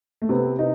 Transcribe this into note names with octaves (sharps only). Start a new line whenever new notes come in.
A3
C3 B3
C3 D#4